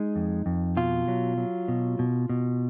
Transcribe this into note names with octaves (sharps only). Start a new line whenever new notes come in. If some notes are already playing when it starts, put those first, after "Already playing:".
Already playing: G#3 D#4
F2
F2
B2 F4
F#3
F#3
B2
B2
B2